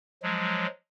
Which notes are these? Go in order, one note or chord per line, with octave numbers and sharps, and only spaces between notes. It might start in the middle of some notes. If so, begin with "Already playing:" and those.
F3 F#3 G#3